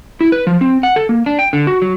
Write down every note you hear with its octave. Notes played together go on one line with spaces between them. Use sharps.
E4
B4
F3
C4
F#5
A4
A#3
D4
G5
D3
F#4
F#3